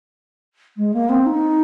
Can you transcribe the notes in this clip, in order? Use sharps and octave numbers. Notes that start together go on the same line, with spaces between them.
G#3
A#3
C4
D#4